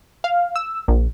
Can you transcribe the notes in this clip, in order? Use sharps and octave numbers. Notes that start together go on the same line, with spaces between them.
F5
E6
A#1